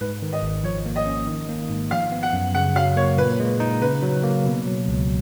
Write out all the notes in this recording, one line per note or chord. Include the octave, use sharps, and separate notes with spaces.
G#2 B4
D#3
D#5
G#1
F3 C#5
A#3
D#5
C#4
D#3
A#3
G#2
F3 F5
B3
F#5
F#2
C#3 F#5
F#3 F5
A#3 C#5
A#2 B4
G#3
D#4
C#3 B4
F#3
A#3
B2
F#3
C#2